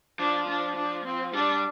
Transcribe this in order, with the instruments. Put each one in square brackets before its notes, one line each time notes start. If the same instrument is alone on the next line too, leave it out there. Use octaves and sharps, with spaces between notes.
[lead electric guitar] F3 [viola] D4
[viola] D4
D4
C4
[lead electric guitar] G3 [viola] D4